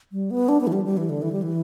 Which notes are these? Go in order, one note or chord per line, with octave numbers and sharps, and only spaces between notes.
G3
B3
D4
B3
E3
G3
G3
E3
D3
E3
G3
E3